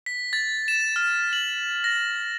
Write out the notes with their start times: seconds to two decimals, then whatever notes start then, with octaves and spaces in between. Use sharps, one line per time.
0.06 B6
0.33 A6
0.68 E7
0.96 F6
1.33 F#7
1.84 A#6